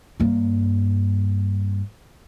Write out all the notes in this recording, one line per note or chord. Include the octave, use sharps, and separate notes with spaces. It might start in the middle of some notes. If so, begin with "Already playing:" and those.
G2 A#3